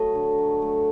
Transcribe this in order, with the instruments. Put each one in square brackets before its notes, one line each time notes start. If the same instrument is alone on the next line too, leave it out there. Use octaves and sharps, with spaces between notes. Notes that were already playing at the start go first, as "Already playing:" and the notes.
Already playing: [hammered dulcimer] F#3 A3 D#5
D3
F#3
A3